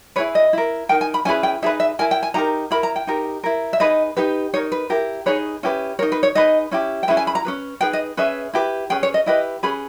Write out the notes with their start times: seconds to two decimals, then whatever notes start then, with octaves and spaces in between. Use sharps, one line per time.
0.16 E4 G#4 B4 C#5
0.35 D#5
0.53 E4 A#4
0.89 D#4 A#4 G5
1.01 G#5
1.14 B5
1.25 C#4 E4 G#4 B4 G#5
1.43 G5
1.62 D#4 G#4 B4 E5
1.80 E5
1.99 E4 A#4 G#5
2.11 G5
2.23 G#5
2.34 D#4 G4 A#4 A#5
2.71 E4 A#4 B5
2.83 A#5
2.96 G5
3.07 D#4 G4 A#4
3.44 E4 A#4
3.73 E5
3.80 D#4 G#4 B4 D#5
4.17 D#4 G4 B4
4.54 D#4 A#4 C#5
4.72 B4
4.90 E4 G4 A#4
5.26 D#4 G#4 B4 C#5
5.63 C#4 E4 G4 B4
5.99 A#4 C#5
6.02 D#4
6.12 B4
6.23 C#5
6.35 D#4 G#4 B4 D#5
6.71 C#4 E4 G4
7.03 G5
7.08 C#4 E4 G#4 B4 E5
7.17 G#5
7.27 B5
7.35 A#5
7.45 C#4 G#4 B4
7.81 D#4 G#4 B4 G5
7.93 D#5
8.17 C#4 G#4 B4 E5
8.53 E4 G4 B4
8.90 C#4 G#4 B4 G5
9.03 C#5
9.14 D#5
9.26 E4 G4 B4 D#5
9.63 C#4 G#4 B4 B5